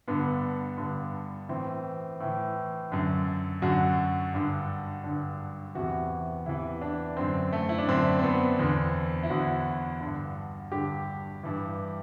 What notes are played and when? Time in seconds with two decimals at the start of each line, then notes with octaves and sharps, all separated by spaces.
0.08 G2 D3 B3
0.78 G2 D3
1.49 A2 E3 C4
2.20 A2 E3
2.92 F#2 D3
3.62 F#2 D3 F#4
4.34 G2 D3
5.04 G2 D3
5.75 E2 C3 E3 F#4
6.46 E2 C3 E3 E4
6.82 D4
7.17 F#2 D3 C4
7.53 A3
7.69 E4
7.78 D4
7.88 F#2 D3 C4
8.19 C4
8.23 B3
8.59 E2 D3 C4
9.23 E4
9.30 E2 D3 F#4
10.01 G2 D3
10.72 G2 D3 G4
11.43 G2 E3